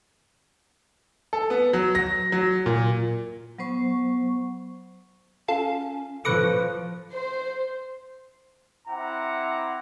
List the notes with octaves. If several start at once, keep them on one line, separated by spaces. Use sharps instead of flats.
A4
B3
F#3
A#6
F#3
A#2
F#3 B3 C5 C#6
C#4 F4 A4
F3 A4 B4 B5 C#6 D6 F#6 A#6
C5
C4 E4 F#5 A#5 D6